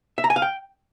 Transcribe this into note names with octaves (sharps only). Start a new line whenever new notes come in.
E5
A#5
G#5
F5
G5